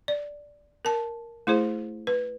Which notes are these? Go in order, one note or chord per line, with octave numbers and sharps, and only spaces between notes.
D5
A#4 A5
A3 E4 G#4 C5
B4